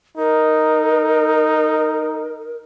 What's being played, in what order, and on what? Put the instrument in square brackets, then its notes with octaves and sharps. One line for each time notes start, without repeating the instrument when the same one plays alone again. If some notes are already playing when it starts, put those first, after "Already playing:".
[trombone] D#4 [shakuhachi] A#4